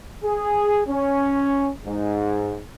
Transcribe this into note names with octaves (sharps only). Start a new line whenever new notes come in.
G#4
C#4
G#2